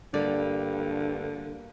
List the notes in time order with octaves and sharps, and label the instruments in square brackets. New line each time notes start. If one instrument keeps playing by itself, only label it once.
[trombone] G2 [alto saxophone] D3 [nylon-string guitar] G3 A#3 D5